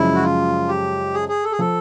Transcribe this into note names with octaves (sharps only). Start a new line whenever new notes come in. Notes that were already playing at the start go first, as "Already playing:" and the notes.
Already playing: F#2 C#3 F3 G#3 E4
F#4
F4
G4
G#4
G#4
A4
G#4
F3 A4